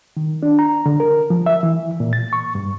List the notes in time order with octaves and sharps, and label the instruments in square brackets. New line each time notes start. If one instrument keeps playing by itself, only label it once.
[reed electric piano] D#3
D4
A#5
D3
A#4
F3
E5
E3
A#2
A6
C#6
G2